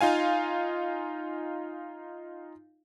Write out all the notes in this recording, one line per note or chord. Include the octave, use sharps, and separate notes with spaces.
D#4 F4 F5 G#5